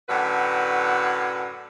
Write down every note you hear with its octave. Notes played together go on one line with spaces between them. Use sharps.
F#2 A2 D3 F#4 B4